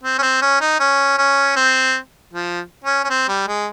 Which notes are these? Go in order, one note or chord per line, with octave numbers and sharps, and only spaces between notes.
C4
C#4
C4
C#4
D#4
C#4
C#4
C4
F3
C#4
C#4
C4
G3
G#3